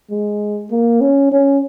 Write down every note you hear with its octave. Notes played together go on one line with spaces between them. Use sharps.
G#3
A#3
C#4
C#4